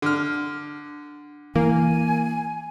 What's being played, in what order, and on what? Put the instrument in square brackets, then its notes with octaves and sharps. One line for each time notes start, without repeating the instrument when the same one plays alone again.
[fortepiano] D3 F6
[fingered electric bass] E3 [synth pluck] A#3 [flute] G#5